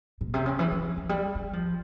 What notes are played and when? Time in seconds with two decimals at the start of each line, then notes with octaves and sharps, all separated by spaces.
0.21 A#2
0.34 C3
0.46 C#3
0.59 E3
0.72 F3
0.97 F3
1.09 G3
1.35 G3
1.53 F3